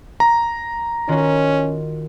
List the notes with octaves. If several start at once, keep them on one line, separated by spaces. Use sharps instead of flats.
A#5
D#3 C#4 F4 F#4